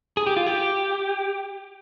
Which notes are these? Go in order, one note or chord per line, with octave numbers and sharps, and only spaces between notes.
G#4
G4
F4
G4